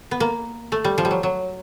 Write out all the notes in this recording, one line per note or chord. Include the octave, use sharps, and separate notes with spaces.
B3
A#3
A3
G3
F3
G3
F#3
F#3